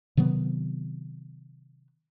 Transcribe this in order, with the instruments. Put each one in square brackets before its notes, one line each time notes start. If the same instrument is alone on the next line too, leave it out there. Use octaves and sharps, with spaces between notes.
[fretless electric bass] C3 D#3 F#3 B3